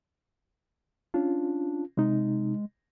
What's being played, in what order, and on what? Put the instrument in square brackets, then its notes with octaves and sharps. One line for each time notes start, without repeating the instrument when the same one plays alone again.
[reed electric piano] C#4 F4 [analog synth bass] D4
[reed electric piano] C3 D#4 [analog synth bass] G#3